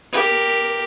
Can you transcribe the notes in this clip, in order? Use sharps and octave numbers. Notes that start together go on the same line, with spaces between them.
G4 A#4